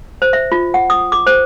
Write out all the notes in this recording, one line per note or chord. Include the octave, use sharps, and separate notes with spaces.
C5
E5
F4
F#5
D#6
D6
C5